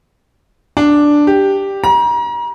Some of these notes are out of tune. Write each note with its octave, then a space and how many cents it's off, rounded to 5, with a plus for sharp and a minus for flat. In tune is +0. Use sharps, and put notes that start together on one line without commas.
D4 +0
G4 +0
A#5 +35